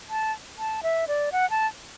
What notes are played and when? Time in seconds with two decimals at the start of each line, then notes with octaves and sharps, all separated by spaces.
0.10 A5
0.59 A5
0.83 E5
1.08 D5
1.32 F#5
1.50 A5